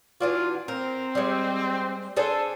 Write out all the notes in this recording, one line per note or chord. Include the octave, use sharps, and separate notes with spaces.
E3 D4 F4 F#4
C4 A#4
G3 G#3
D4 G#4 A4 C5